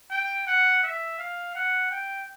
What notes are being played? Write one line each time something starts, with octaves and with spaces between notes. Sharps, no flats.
G5
F#5
E5
F5
F#5
G5